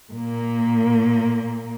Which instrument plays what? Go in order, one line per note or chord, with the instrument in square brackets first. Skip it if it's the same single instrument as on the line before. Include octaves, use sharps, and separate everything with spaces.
[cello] A#2 A#3